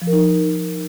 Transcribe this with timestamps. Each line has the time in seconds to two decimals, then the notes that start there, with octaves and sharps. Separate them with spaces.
0.02 F3
0.07 A#4
0.13 D#4